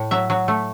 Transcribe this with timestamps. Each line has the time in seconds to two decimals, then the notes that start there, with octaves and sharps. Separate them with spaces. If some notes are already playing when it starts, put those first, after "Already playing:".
Already playing: A2
0.11 F#3 E5
0.30 F#3
0.48 A3